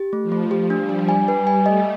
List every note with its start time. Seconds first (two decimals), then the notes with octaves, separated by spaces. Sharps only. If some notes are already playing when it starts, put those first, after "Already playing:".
Already playing: G4
0.13 A3
0.23 F3
0.32 A3
0.51 F3 G4
0.70 D4
0.80 G3
0.89 D4
1.09 G3 G#5
1.28 B4
1.47 G#5
1.66 A3 D#5